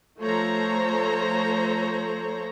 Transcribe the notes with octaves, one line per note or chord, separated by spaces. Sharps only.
F3 A3 A4 C5 C#5 A#5